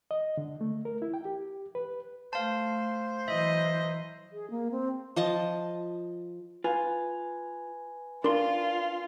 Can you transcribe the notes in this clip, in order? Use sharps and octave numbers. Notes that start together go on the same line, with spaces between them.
D#5
D3
A3
A#4
E4
G5
G4
B4
A3 C5 F5 A5
E3 F#3 D#5 E5
G#4
A#3
C4
F3 D#5 A5
F4 B4 G#5
D4 F4 A#4 C6